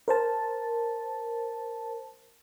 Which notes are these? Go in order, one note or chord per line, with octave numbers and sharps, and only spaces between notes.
A#4 C5 A5